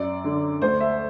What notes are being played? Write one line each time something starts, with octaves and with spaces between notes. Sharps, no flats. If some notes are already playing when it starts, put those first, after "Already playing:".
Already playing: F#2 D5
D3
D2 C5
E5